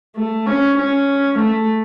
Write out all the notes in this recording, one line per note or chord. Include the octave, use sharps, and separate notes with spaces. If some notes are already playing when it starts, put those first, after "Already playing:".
A3
C#4
C#4
A3